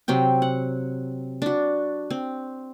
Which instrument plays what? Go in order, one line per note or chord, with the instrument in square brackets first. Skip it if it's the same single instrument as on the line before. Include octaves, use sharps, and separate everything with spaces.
[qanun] C3 F#3 C4 G5
F#5
D4 F#4
C4